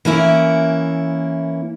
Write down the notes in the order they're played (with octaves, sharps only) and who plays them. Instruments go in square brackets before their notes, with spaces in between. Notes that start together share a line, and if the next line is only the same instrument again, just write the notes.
[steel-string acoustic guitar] E3 A#3 C#4 E4